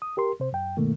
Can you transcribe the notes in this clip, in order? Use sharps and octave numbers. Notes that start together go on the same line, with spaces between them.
D#6
G4 A#4 C6
C3 C5
F#2 G5
G2 B2 D#3 A3 A#3